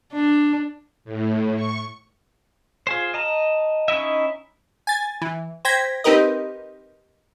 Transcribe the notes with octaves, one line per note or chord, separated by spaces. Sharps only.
D4
A2
C#6
F4 G#4 C5
D#5 A5 A#5
C#4 D#4 E4 D#5 E5
G#5 A6
E3
C5 G5 G#6 A#6 B6
C4 D#4 G4 A#4 B4 D#5